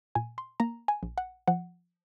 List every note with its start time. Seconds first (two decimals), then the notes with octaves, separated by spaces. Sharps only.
0.15 A#2 G#5
0.38 C6
0.60 A#3 A#5
0.88 G#5
1.03 A#1
1.18 F#5
1.48 F3 F#5